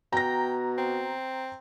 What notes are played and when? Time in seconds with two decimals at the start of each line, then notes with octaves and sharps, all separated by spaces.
0.13 B2 G5 A#5 A#6
0.78 C4